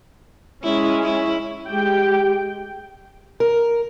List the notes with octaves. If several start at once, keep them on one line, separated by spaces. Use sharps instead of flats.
G#3 C#4 E4
E4
G#3 G4 G5
A#4